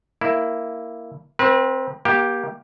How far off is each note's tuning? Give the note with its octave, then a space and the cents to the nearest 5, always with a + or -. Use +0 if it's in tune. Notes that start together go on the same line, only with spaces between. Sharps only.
A#3 -5 E4 +0
C4 +5 B4 -40
A#3 +30 G4 +0